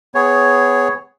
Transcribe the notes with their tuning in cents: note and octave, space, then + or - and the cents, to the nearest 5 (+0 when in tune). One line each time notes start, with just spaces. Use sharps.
B3 +20 G#4 -5 C#5 +0